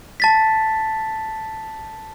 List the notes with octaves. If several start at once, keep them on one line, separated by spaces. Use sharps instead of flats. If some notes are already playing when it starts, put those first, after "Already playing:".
A5 A6 B6